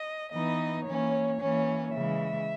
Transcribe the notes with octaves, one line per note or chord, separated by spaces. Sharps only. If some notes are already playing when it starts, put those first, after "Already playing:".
Already playing: D#5
E3 B3 D#4 D#5
E3 A#3 C#4 C#5
E3 A#3 C#4
C#3 E3 G#3 E5